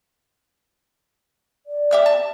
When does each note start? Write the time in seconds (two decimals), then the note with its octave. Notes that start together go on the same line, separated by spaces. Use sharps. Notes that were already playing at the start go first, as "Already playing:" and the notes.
1.66 D5
1.91 G4 E5 F6
2.06 A5